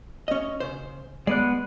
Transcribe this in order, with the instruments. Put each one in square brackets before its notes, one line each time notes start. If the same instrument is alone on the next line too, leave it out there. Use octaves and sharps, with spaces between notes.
[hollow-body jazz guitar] C#4 D#5
C#3 C5
[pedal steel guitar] G#3 B3 F#6 [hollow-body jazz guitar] D5